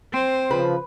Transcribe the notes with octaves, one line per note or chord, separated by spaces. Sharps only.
C4 C5
C#3 F3 B4